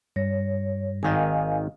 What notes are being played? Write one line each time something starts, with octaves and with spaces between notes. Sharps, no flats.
G2 G3 C#5 A#6
G#1 D#3 D#5 F5 G#5